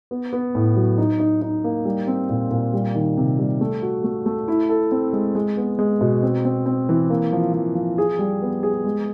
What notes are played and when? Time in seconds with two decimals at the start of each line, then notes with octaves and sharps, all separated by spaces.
0.11 B3
0.33 B3
0.55 A2
0.77 F#3
0.98 D#4
1.19 D#4
1.42 D#4
1.64 A#3
1.85 G3
2.08 C4
2.29 A#2
2.51 A#2
2.74 G3
2.95 D#3
3.17 C3
3.39 G3
3.61 A3
3.82 F#4
4.04 A3
4.26 A3
4.48 E4
4.69 A4
4.92 C4
5.13 G#3
5.35 G#3
5.57 B3
5.79 G#3
6.01 B2
6.23 C4
6.45 C4
6.66 C4
6.89 E3
7.10 A#3
7.33 F3
7.53 F3
7.75 F3
7.98 G#4
8.19 G3
8.42 B3
8.63 G#4
8.84 G#3